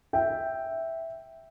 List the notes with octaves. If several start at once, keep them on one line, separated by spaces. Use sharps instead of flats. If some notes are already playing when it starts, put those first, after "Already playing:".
E5 G5